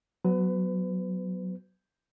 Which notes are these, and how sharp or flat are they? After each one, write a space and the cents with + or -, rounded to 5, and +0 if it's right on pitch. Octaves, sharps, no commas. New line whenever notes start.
F#3 +0 B3 +0 B4 +35